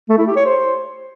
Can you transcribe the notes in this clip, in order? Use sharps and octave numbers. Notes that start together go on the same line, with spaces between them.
A3
E4
G4
C#5
C5